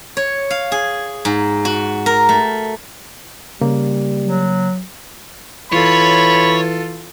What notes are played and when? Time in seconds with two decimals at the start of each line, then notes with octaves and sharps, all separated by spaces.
0.17 C#5
0.50 F5
0.72 G#4
1.25 G#2
1.65 F#4
2.06 A#4
2.29 A3
3.61 C#3 G3 A#3
4.23 F#3
5.73 E3 F4 A4 C#5 B5